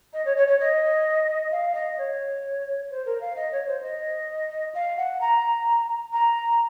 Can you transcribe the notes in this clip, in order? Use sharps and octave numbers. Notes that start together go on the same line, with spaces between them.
D#5
C#5
C#5
C#5
D#5
F5
D#5
C#5
C5
A#4
F5
D#5
C#5
C5
D#5
F5
F#5
A#5
A#5